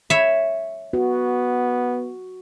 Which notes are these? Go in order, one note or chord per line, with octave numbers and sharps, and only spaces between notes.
C#5 E5
B3 F#4